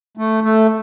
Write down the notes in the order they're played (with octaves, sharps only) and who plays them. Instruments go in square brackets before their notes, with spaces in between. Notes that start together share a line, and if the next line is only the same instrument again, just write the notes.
[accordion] A3
A3